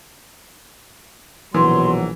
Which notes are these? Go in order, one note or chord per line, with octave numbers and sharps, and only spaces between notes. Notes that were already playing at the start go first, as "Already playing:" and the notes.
A#1 B2 E3 F#3 C6